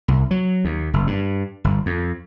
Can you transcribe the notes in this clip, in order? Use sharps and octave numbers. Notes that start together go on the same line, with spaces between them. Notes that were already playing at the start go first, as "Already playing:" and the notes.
C2
F#3
D#2
F#1
G2
G1
F2